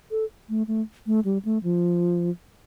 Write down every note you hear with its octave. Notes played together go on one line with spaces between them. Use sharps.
A4
A3
A3
A3
G3
A3
F3